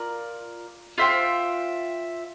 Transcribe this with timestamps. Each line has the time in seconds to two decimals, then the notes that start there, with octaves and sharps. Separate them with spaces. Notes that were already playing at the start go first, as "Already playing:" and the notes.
Already playing: F4 A#4 D5
0.98 F4 C5 E5 G5